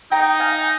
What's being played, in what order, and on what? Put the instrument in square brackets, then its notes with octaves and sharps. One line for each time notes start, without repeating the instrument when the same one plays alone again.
[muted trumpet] D#4 [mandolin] G5 A#5
[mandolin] F5 G#5